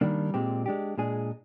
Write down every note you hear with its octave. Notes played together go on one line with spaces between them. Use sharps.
D#3 G3 A#3 D4
A#2 G#3 C4 G4
G#3 D4 G4
A#2 G#3 D4 G#4